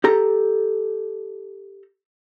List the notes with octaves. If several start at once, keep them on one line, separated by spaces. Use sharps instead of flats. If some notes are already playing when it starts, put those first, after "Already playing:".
G4 A4 A#5